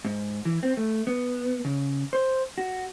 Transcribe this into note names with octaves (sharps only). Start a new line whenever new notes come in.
G#2
E3
C4
A3
B3
C#3
C5
F#4